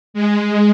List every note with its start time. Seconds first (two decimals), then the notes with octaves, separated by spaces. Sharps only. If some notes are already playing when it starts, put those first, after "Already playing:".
0.14 G#3